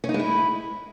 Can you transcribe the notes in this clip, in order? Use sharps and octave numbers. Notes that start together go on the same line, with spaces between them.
C#4
D#4
G#3
E4